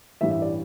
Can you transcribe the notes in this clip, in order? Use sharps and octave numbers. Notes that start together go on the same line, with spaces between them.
A1 G2 E3 E5
E5
D5